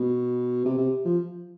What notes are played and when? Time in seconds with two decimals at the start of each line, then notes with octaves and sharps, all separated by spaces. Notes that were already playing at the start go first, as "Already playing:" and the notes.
Already playing: B2
0.65 C3
0.78 C3
1.05 F3